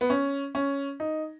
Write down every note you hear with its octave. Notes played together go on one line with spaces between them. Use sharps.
B3
C#4
C#4
D#4